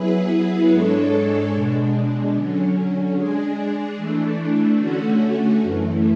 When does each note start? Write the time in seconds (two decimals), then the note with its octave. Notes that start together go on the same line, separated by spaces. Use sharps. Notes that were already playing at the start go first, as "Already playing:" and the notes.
Already playing: F#3 B3 E4 G#4 B4
0.72 G#2 G#3 D4 A4 C#5
1.53 B2 G#3 D4
2.35 D3 F#3 C#4
3.16 G#3 D4 G#4
3.97 E3 A3 D4
4.78 D3 A3 C#4 F#4
5.60 F#2 E3 A3